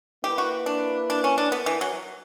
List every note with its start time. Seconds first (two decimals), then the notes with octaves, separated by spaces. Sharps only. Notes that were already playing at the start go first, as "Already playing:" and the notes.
0.24 A#3 E4 G4 B4
0.38 F#4
0.66 D4
1.10 D4
1.24 C#4
1.38 D4
1.52 B3
1.66 E3
1.81 F#3